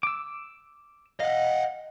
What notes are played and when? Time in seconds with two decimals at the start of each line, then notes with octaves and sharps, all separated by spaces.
0.03 D6 E6
1.20 D#5 F5 F#5